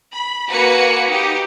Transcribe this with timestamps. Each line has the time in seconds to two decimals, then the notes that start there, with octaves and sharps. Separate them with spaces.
0.13 B5
0.49 A#3 F#4 B4 G#5 A#5 C#7
1.09 D#4 G4